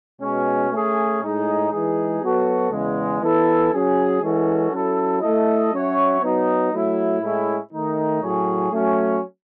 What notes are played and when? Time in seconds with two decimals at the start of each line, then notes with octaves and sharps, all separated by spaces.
0.22 B2 G#3 C#4
0.71 A3 C#4 G#4
1.21 A2 G#3 D#4 G#4
1.72 E3 G#3 D#4 G#4
2.22 F#3 B3 F#4 A4
2.72 E2 C#3 G#3
3.21 E3 B3 E4 A4
3.72 F#3 C#4 G#4
4.22 E3 G#3 C#4 F#4 A4
4.71 F#3 C#4 E4 A4
5.22 A3 E4 A4 D#5
5.72 F#3 C#4 F#4 C#5 E5
6.22 F#3 B3 D#4
6.72 F#3 A3 E4
7.22 A2 G#3 C#4 E4 G#4
7.72 D#3 A3 D#4
8.22 A2 F#3 C#4 G#4 C#5
8.72 F#3 A3 C#4